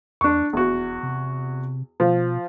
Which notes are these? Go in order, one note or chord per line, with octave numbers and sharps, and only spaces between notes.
E2 D4 C#6
F1 E2 F#4
C3
B2 F3